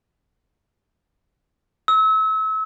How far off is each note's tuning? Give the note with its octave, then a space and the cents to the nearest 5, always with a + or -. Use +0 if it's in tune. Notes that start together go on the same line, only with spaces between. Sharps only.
E6 -35